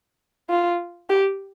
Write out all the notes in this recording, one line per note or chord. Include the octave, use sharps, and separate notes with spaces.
F4
G4